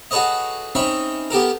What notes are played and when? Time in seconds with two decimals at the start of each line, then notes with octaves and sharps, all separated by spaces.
0.11 F#4 G#4 A4 B4 C#5 D#5
0.75 C4 C#4 D#4 C#5 E5 B5
1.30 B3 G4 A4 A#4